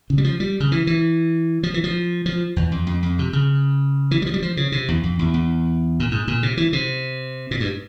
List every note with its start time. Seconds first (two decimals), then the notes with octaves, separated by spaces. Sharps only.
0.10 C#3
0.18 G3
0.24 F3
0.40 G3
0.60 C#3
0.72 E3
0.87 E3
1.63 F3
1.74 E3
1.84 F3
2.26 F3
2.56 E2
2.72 F2
2.87 F2
3.03 F2
3.19 C3
3.33 C#3
4.11 E3
4.22 G3
4.26 F3
4.34 G3
4.42 F3
4.57 C#3
4.72 C3
4.88 E2
5.03 F2
5.19 E2
5.34 E2
6.00 A#2
6.11 G#2
6.28 A#2
6.43 C3
6.57 E3
6.73 C3
7.51 A#2
7.60 G2